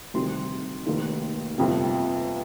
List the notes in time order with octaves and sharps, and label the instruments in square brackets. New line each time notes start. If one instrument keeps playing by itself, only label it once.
[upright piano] D2 C3 D#3 G3 C4 C6
F1 D#2 D#3 A#3
G1 F2 C3